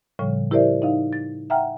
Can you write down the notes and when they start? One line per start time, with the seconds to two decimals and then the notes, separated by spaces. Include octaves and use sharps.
0.19 A2 C#3 F3 G3 C#5
0.51 E4 G4 A#4 C5 D5 E5
0.82 D#4 D#5 F5
1.13 A6
1.50 E5 F#5 G5 A#5 F6